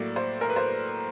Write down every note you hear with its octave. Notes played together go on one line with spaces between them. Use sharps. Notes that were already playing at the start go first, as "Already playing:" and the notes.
Already playing: A2 F#3 A#3 D5
C5
A#4
B4
C5